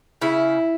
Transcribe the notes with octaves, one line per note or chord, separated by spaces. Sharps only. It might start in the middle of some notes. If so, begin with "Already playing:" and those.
C#3 E4